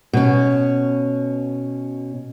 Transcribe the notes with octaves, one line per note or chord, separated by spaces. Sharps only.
B2 C#4